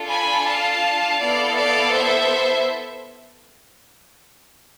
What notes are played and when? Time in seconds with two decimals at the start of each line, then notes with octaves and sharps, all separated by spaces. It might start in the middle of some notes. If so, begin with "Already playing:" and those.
Already playing: D4 F4 A4
0.08 G#5 B5
0.46 F5 A5
1.19 B3 E4 A4 D5 F5
1.56 D5 F5
1.93 C5 E5